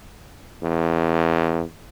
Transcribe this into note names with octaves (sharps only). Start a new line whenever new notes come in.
E2